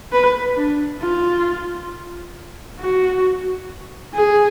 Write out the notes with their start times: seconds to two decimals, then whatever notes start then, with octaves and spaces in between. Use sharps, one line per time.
0.12 B4
0.57 D4
1.02 F4
2.80 F#4
4.15 G#4